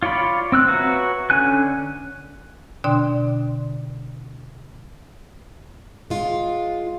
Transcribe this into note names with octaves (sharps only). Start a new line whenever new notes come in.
F4 C#5 D5 B5
C4 E6 F#6
F#4 B4 C#5 E5 A#5
D3 C#4 G#5 F#6
B2 D3 D4 D5 G5 C6
G#3 F4